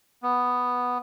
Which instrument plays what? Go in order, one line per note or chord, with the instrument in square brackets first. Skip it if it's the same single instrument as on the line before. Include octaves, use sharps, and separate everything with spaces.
[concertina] B3